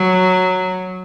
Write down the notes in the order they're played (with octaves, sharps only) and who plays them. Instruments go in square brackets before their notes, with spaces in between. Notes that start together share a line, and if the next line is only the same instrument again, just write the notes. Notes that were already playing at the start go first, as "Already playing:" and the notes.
Already playing: [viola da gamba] F#3